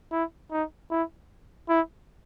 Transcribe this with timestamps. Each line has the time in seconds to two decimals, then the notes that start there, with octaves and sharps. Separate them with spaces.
0.12 E4
0.51 D#4
0.91 E4
1.69 E4